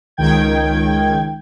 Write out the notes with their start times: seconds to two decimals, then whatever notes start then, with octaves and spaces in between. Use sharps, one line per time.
0.17 C#2 D#3 G5 G#6